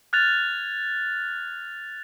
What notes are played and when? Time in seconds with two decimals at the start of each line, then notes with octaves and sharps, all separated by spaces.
0.13 F6 F#6 G#6 A6 F7